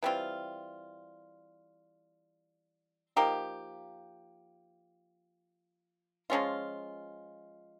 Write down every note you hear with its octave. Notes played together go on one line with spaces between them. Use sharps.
E3 G3 C4 F4
F3 A#3 D#4 G4
F3 G#3 C#4 F4